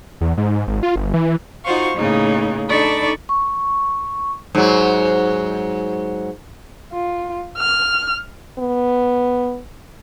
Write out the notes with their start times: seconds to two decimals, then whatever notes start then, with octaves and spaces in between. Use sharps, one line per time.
0.21 E2
0.37 G#2
0.67 G#1
0.83 F4
0.96 G1
1.14 E3
1.64 D#4 F4 F#4 C5 F5 C#6
1.96 A2 C#3 A#3 D#4
2.69 D4 D#4 A4 D5 B5 C#6
3.29 C#6
4.55 G#2 F#3
6.93 F4
7.58 F6
8.59 B3